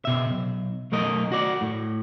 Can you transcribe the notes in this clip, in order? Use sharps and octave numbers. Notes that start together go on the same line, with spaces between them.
B2 E5
B1
B1 A3 A#4 D#5
F#4 D5
A2